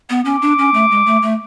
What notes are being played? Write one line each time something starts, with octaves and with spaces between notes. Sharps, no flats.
B3
C#4 D6
D4
C#4
A3
G#3
A3
A3